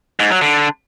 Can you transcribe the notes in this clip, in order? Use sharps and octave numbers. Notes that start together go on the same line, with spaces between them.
G#2
F#3
D3